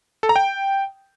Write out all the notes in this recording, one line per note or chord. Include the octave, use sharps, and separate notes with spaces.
A4
A#5
G5